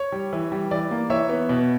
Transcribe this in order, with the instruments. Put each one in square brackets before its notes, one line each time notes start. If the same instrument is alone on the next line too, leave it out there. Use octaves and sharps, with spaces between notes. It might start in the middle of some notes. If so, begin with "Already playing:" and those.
Already playing: [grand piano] C#5
G3
E3
G3
E3 D5
A#3
E3 C#5 E5
B3
B2